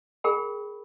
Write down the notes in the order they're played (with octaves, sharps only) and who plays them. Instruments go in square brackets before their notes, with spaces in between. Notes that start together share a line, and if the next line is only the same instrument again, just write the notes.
[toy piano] G#4 A#4 G5 B5